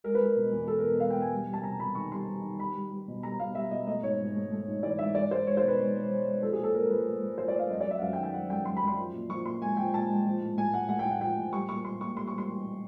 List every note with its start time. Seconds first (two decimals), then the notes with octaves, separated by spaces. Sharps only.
0.04 G#3 A#4
0.15 B4
0.20 G#3
0.25 A#4
0.36 B2
0.52 E2
0.68 E2 A4
0.79 A#4
0.84 B2
1.00 G#3 F5
1.10 G5
1.16 B2 G#5
1.32 G3
1.48 G3
1.53 A5
1.63 C3 A#5
1.80 C3 B5
1.95 D#3 C#6
2.12 G3 C6
2.28 G3
2.43 D#3
2.59 G3 B5
2.75 G3
2.91 G3
3.08 B2
3.23 G3 A#5
3.39 B2 F5
3.55 G3 E5
3.71 B2 D#5
3.87 A3 D#5
4.03 G#2 C#5
4.19 G#2
4.35 A3
4.51 A3
4.67 G#2
4.83 E3 D5
4.99 G#2 E5
5.14 G#3 D5
5.30 G#3 C5
5.47 G#3 C#5
5.57 C5
5.63 B2
5.68 B4
5.79 G#3
5.95 B2
6.11 G#3
6.26 G#3
6.42 F3 A4
6.53 G#4
6.58 A#2
6.64 A4
6.74 A#2 A#4
6.90 F3 B4
7.06 A3
7.22 A3
7.38 F3 C5
7.48 D5
7.54 A3
7.59 F5
7.70 F#2 D#5
7.81 D5
7.86 F#3 E5
7.98 F#5
8.02 F#2 F5
8.13 G5
8.17 D#3
8.23 G5
8.34 F#2 F#5
8.50 F#2 G5
8.65 F#2 C6
8.76 B5
8.82 F#2
8.88 C6
8.98 F3
9.13 A#2
9.30 F3 C#6
9.45 A#2 C6
9.62 G#3 G#5
9.77 F3 G5
9.94 A#2 A5
10.09 G#3
10.26 F3
10.41 A2
10.57 A2 G#5
10.74 A3 F#5
10.89 A3 F#5
10.99 G5
11.05 A2
11.11 F#5
11.21 F3 G5
11.37 A2
11.53 G3 C#6
11.69 A#2 C#6
11.85 A#2 C6
12.01 A#2 C#6
12.17 G3 C6
12.28 C#6
12.32 G3
12.38 C6
12.49 G3
12.65 A#2